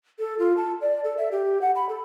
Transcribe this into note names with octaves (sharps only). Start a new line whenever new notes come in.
A4
F4
A5
D5
A4
E5
G4
F#5
B5
A4